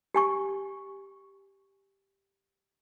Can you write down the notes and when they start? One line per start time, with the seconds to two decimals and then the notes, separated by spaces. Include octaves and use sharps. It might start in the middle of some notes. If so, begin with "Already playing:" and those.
0.15 G4 G#5 C#6